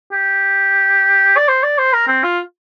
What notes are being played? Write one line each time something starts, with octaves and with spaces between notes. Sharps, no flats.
G4
D5
C5
D5
C5
A#4
C4
F4